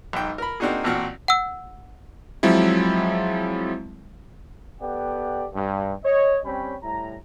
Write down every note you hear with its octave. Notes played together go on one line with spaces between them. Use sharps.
B1 G#2 D#4 G5
A#4 B5
A#3 C4 D4 D#4 F#4 G#4
A1 A#2 C4 F#4 F6
F#5 E6
F3 F#3 G#3 C4 E4
B3 G4 A4 D5 F#5 G5
G2
C#5 D#5
G3 C4 C#4 C#5 G5 B5
A2 G3 E4 A#5